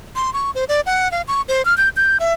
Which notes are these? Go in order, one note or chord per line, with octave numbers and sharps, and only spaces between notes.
C6
C#6
C5
D5
F#5
F5
C#6
C5
F6
G6
G6
E5